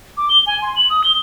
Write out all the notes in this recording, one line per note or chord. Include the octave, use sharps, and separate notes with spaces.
D6
G7
G#5
C6
F#7
D#6
G7